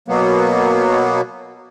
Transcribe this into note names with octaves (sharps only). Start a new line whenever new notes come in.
B2 F#3 A#3 B3